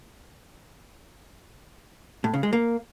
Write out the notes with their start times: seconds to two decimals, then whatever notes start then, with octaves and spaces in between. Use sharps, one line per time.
2.24 A2
2.34 C#3
2.43 G#3
2.53 A#3